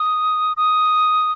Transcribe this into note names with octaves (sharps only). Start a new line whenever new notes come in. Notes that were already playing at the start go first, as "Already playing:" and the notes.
Already playing: D#6
D#6